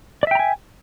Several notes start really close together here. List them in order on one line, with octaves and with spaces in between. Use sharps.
D5 E5 G5 A#5 G#5